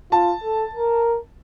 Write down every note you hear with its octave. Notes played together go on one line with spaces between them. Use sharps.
F4 A5
A4
A#4